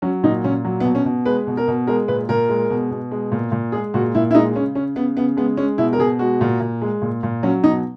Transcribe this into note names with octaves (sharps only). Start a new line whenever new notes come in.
F#3 C#4
A#2 D#4
A#2 C#4
F#3
B3
B2
C#4
B2
G#3 B4
B2
A#4
B2
G#3 A#4
A#2 B4
A#2 A#4
G#3
B2
B2
G#3
A#2
A#2
G#3 G#4
A#2 F#4
A#2 E4
E4
G#3 D#4
C#3 C#4
C#3 C#4
C#3 B3
C#3 B3
G#3 B3
G#3 C#4
B2 E4
A#4
B2 G#4
G#3 F#4
A#2
A#2
G#3
A#2
A#2
F#3 C#4
B2 D#4